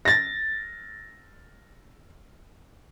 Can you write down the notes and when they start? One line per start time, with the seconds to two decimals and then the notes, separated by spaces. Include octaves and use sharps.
0.05 A6 A#6